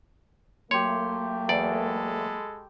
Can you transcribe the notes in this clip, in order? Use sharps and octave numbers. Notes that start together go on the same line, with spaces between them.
F#3 A3 A#3 G4 C#5 C6
E2 G#3 A4 D5 B5